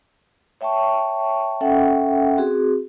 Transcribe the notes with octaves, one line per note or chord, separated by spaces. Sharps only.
C#5 E5 G5 A5 C#6
C#4 A4 E5 F#5 G5
C4 F#4 G#4